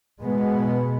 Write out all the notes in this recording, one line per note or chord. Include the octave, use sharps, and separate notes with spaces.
B2 G#3 B3